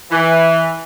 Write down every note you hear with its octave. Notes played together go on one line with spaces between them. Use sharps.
E3